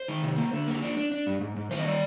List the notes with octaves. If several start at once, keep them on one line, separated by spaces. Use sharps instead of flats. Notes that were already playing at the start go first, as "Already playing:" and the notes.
Already playing: C5
D#3
C3
A#3
D3
A#3
D4
D4
D4
G2
G#2
G#2
D#3 C5
D#5
G3 D5